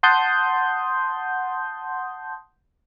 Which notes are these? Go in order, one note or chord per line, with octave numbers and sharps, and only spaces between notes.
F#5 A5 C6 D#6 G6